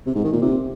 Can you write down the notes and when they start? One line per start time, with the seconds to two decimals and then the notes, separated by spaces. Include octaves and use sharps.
0.06 C3
0.15 G#2
0.24 D#3
0.32 A#2
0.41 C3